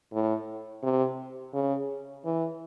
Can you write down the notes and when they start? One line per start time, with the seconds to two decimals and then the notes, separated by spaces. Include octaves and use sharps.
0.13 A2
0.83 C3
1.54 C#3
2.25 E3